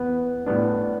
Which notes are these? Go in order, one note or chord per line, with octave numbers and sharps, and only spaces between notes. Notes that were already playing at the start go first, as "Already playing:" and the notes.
Already playing: E2 B3 B4
A2 G3 B3 D4